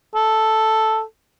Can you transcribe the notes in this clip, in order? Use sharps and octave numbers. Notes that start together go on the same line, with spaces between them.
A4